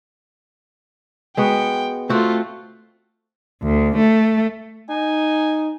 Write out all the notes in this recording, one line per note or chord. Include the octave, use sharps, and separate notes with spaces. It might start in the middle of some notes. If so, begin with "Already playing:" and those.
G#3 B3 F#4 G5
A3 C4 F4 F#4
D2
A3
D#4 G#5